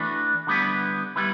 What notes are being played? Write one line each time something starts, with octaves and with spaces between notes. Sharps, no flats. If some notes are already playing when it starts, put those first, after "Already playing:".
Already playing: E3 A3 D4 F#4 B4
D3 G3 B3 E4 B4
G3 B3 E4 B4